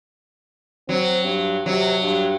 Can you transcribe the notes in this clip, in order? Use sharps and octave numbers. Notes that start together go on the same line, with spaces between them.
F#3 C4
G2
C3 F#3
G2